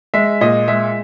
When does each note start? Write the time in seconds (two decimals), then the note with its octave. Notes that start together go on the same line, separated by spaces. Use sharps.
0.14 G#3 E5
0.41 A#2 D#5
0.68 G#3 E5